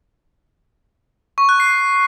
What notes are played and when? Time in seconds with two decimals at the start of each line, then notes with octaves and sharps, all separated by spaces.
1.38 C#6
1.49 F#6
1.60 C7